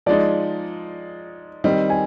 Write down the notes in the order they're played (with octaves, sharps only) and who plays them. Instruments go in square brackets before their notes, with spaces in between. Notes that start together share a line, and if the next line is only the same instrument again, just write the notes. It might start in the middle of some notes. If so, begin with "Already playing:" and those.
[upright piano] F3 G#3 D#4 [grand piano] D5
[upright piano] D#3 G3 C4 [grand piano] D#5
[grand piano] G#5